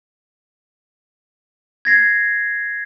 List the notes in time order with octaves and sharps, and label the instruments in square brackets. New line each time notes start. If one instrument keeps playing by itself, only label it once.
[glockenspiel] G#6 A#6 C7